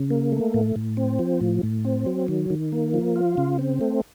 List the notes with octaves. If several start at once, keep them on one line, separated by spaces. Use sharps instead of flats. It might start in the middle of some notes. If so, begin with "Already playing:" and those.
Already playing: C#3
A#3
A3
A2
A2
C4
F3
A2
A2
C4
F#3
D#3
D#3
A#3
F3
F4
C#3
C4
A3